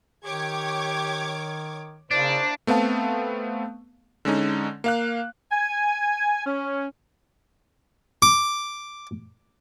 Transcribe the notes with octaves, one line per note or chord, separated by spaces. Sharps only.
D#3 G4 C#5 D6 G#6
C#3 A#3 D4 E4 C5
A3 B3 C4 F5 A5
D3 G#3 C#4 D#4
A#3 F5 F#6
G#5
C#4
D6